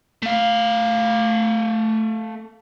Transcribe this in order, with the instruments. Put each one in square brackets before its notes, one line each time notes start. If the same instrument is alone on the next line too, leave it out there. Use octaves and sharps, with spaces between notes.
[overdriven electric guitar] A3 F5